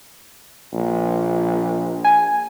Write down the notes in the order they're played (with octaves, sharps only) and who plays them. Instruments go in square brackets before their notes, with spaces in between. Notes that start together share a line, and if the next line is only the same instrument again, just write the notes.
[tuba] A#1
[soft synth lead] G#5